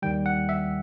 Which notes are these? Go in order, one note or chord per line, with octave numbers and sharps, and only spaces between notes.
D#2 D#3 G3 G5
F#5
E5